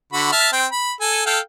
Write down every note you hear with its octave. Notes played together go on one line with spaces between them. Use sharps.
D3 F#4 B5
E5 A5 F6
C4 G5
B5
A4 G#5
A4 F5 G5